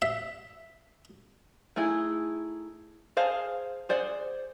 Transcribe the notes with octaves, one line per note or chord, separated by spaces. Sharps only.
E5
A3 D#4 E4 G#4
G#4 C5 F5 A5
G#4 C5 D5 F#5